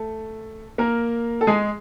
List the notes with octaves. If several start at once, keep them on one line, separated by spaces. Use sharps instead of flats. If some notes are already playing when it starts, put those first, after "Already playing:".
Already playing: A3 A4
A#3 A#4
A4
G#3 G#4